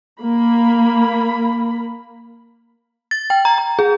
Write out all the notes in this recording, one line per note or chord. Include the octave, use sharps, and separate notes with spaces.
A#3 B5
A6
G5
A#5
A#5
G#4